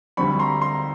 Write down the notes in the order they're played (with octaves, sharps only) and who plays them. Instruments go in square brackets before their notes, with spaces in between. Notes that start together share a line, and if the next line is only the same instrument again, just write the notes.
[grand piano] D2 D3 G3 C4 B5 C#6
A#5 C6
A#5 C6